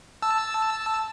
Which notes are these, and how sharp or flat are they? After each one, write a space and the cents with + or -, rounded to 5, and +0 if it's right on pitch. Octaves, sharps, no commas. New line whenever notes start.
A5 +0 E6 +0